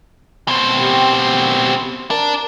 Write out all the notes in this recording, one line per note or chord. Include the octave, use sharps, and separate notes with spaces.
B2 C4
G4
D4 A#4